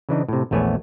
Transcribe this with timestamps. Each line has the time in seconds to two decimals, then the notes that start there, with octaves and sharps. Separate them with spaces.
0.09 C#3 E3 D4 D#4
0.28 A2 C3
0.51 A#1 E2 A3 B3 C#5 G#5